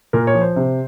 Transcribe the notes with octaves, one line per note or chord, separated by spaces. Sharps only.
A#2 A#4
C#5
F3
C5
C3